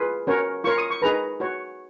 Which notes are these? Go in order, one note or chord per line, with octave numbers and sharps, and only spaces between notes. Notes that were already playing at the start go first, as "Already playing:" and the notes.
Already playing: F4 G#4 B4
C#4 F#4 A#4 C#5
F4 A#4 C#5 C#6
D#6
C#6
D#4 G#4 B4 A#5
F#4 C#5